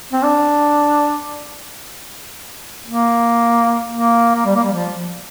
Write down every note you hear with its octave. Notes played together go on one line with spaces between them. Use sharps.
C4
D4
A#3
A#3
A#3
G3
A#3
G3
F3